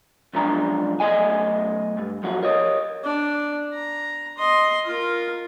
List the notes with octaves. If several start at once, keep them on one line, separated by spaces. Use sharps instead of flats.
B1 G#2 F3 D4 A#5
B1 A3 D#5 G#5
G2
B1 F2 F3 F#4
A#4 C#5 D#5
D4
A#5
D#5 C6
F4 A#4